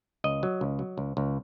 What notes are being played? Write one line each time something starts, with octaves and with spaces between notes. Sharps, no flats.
C#2 D#5
F#3
C#2
F#3
C#2
C#2